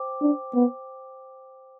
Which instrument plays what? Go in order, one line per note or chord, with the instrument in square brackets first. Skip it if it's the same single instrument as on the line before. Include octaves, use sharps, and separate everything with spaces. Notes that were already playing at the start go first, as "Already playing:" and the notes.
Already playing: [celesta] C5 G5 D6
[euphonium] D4
B3